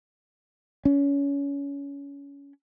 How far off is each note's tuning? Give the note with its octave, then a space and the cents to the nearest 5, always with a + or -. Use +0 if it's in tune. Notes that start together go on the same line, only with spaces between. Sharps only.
C#4 +25